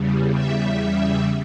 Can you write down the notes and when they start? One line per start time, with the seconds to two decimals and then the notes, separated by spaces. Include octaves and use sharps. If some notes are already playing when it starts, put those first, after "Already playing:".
Already playing: E2 C#3 G3
0.31 E5